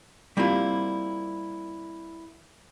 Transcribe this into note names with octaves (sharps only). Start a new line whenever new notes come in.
G3 A#3 C4 E4 F4